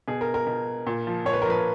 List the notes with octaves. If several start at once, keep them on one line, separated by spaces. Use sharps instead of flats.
B2 G#4
A#4
A#4
B2
A#2
F3
A#2 C#5
B4
A#4
F3 B4